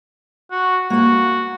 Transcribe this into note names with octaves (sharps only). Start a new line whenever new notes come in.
F#4
A#3 F#4 F#5